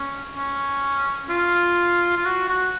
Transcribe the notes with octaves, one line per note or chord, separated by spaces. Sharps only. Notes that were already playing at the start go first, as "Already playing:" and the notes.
Already playing: C#4
C#4
F4
F4
F#4
F#4